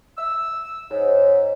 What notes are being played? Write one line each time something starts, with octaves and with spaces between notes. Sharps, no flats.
E6
G#2 C#5